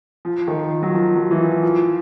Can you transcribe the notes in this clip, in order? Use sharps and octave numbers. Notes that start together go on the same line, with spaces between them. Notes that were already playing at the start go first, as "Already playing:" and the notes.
F3
D#3
F#3
F3
F#3
E3
F3
F3